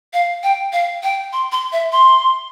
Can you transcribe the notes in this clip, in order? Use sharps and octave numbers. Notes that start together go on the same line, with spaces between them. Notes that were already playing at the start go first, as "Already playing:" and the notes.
F5
G5
F5
G5
C6
C6
E5
C6